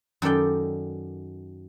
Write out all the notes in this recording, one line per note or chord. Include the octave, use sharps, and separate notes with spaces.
F#2 D#3 A4 D5 G5